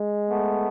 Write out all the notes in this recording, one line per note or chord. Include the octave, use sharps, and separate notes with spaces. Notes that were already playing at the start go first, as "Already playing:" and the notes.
Already playing: G#3
A3 B3